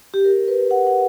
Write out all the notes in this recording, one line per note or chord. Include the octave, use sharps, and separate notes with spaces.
G4
A#4
B4
F#5
F#5